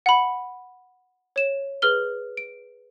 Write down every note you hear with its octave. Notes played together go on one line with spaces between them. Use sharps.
F#5 B5
C#5 E7
G#4 B4 F6 G7
D7